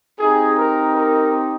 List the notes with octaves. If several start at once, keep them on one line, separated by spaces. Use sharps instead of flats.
C4 D#4 G4 G#4
A#4
A#4